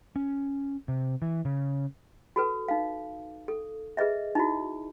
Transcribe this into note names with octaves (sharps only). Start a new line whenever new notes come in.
C#4
C3
E3
C#3
F#4 A4 B4
D#4 F5
A4
G#4 B4 D#5 E5
D#4 E4 F#4